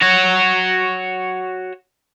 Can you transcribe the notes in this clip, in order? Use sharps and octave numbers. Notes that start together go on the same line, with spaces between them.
F#4 C#5